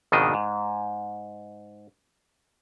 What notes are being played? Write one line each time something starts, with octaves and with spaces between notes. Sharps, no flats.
G#1 F2 B2 D#3 D4 D#5
G#2